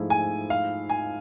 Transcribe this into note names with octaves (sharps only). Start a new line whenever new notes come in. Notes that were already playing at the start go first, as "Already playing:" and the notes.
Already playing: G#2 F3 A3 E4 G#4
G#5
F5
G#5